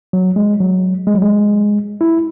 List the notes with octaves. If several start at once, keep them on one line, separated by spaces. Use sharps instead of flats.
F#3
G#3
F#3
G#3
F#3
G#3
E4